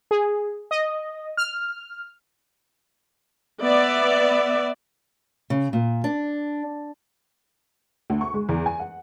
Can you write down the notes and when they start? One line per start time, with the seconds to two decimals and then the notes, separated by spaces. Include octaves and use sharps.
0.11 G#4
0.71 D#5
1.37 F6
3.62 B3 D5 E5
5.50 C#3
5.73 A#2
6.04 D4
8.10 D2
8.21 C#6
8.34 G#3
8.49 E2
8.66 G#5
8.80 F#5